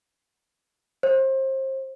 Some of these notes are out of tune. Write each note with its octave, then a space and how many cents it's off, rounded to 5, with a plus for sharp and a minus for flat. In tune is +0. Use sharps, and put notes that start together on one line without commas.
C5 +30